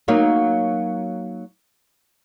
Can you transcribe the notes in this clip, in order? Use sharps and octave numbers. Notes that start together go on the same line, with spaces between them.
F#3 A#3 D#4